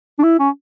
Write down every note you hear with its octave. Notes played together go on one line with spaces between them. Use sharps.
D4
E4
C#4